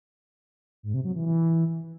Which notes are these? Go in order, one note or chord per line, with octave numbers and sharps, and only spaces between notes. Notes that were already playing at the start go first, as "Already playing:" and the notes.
G#2
C3
F#3
E3
E3